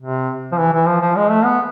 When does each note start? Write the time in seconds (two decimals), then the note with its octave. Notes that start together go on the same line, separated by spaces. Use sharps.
0.01 C3
0.52 F3
0.58 E3
0.73 E3
0.87 F3
1.01 F3
1.16 G#3
1.30 A3
1.44 B3